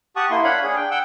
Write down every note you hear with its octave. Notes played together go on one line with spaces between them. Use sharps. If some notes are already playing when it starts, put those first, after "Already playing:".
G4 F#5 A5 C#6 D#6
A#3 E4 C6
D4 C#5 F5 F#5 B5
D4 G#4
G5
F#5 G5 E6 G6